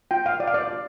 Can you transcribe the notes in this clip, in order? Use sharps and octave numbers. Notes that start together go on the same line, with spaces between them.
F4 G5
F4 F5
F4 D5
F5
F4 D5
F4